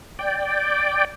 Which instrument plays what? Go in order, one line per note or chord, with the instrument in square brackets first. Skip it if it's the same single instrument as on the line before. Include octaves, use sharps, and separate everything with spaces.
[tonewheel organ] D5 G5